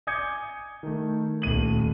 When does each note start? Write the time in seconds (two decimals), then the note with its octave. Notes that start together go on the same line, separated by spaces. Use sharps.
0.07 G#5 D6 D#6 G6 G#6 C#7
0.83 D#3 A3
1.42 D#1 A3 D#7 F#7